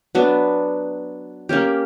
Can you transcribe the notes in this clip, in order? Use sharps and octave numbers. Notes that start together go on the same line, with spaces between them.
F#3 B3 D4
A#3 C#4 G4